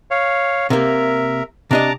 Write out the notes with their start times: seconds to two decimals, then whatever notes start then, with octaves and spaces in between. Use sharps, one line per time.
0.11 C#5 F5
0.70 C3 A#3 A#4 E5
1.71 C3 D4 D#5 A5 A#5 D6